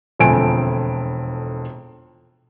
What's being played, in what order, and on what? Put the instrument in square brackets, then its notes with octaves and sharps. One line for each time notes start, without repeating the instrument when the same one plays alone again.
[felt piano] E1 F2 D3 A3 G#5 D7